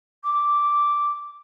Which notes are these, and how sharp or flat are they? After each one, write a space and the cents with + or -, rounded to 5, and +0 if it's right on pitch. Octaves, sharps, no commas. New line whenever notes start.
D6 -5